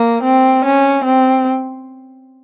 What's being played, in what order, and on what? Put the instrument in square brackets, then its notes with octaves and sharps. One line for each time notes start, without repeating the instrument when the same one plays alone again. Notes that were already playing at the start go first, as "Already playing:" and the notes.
Already playing: [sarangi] A#3
C4
C#4
C4